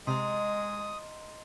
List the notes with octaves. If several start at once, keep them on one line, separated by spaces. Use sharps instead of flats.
C3 G#3 D#5 A#5 C6 D#6